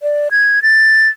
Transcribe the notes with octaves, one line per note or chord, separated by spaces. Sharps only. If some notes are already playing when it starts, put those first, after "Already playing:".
D5
G#6
A6